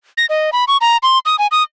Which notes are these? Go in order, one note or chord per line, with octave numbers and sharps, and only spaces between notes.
A#6
D#5
B5
C#6
A#5
C6
D#6
G#5
D#6